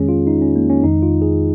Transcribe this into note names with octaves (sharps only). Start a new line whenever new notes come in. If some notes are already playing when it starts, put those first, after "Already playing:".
Already playing: F2 D#3 G#3 C#4 G#4
F4
D#4
C#4
A#3
C#4
F2 D#3 G#3 D#4
F4
G#4